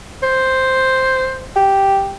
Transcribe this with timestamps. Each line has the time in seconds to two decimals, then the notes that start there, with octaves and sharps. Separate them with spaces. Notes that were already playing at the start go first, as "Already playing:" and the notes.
0.23 C5
1.56 G4